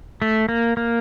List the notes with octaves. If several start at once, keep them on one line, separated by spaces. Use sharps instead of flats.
A3
A#3
A#3